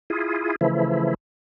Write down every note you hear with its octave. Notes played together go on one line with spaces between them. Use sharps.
E4 F4 G#4
C#3 E3 F3 A3 E4